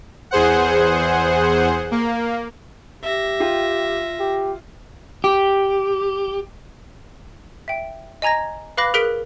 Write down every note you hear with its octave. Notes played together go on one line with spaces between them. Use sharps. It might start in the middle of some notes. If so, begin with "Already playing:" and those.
E2 G#4 C5 F#5
A#3
G4 E5 A#6
F4 G5
G4
G4
E5 G5
D#5 G#5 A#5 G#6 A#6
B4 F5 B5 D6 F#6 A#6
G#4 A#4 F#6 B6 D7